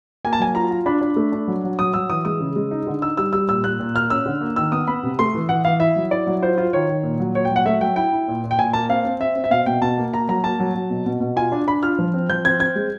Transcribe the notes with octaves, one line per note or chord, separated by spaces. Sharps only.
A#3 G#5
A5
F#3 G#5
F4 A#5
F4
D4 B5
D4
A3
D4
F#3
F#3
F#3 D#6
F#3 E6
E3 D#6
G#3 D#6
C#3
G#3
D#4
D3
D#4 E6
G3 E6
G3 E6
A#2 E6
A#2 F#6
A#2
A#3 F6
C#4 E6
D3
A#3
D#3 E6
B3 D#6
B3 B5
C3
A3 C6
E3
E3 F#5
E3 F5
E4 E5
F#3
E4 D5
F#3
F4 C5
F4
D#3 C#5
D#3
A#2
F#3
A#2 C#5
G5
F#3
F#5
A3 E5
F#3 G5
E4 G5
E4
A#2
A#2
G5
A#2 G#5
A#3 A5
C4 F5
C4
C4 E5
C4
E5
B2 F5
B2 G5
B2 A5
A#3
A#3 A#5
F#3 A#5
A#3 A5
F#3
F#3
B2
B2
B2
F4 G#5
D4
D4 B5
F4 F6
F3
C4
F3 G6
C4 G#6
C4 G#6
G#3